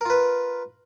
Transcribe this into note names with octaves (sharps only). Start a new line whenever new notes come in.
F4 A#4 B4